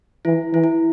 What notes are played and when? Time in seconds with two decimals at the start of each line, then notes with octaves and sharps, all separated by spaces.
0.25 E3 E4
0.53 E3 E4
0.64 E4